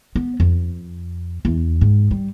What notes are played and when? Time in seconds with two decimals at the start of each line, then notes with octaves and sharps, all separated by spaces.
0.16 B3
0.40 F2
1.45 E2
1.81 G#2
2.11 G3